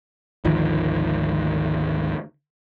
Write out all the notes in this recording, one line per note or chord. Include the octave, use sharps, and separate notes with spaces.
G#1 D2 D#3 F3